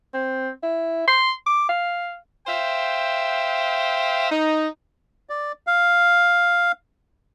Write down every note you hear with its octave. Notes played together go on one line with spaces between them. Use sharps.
C4
E4
C6
D6
F5
C5 E5 F5 G5
D#4
D5
F5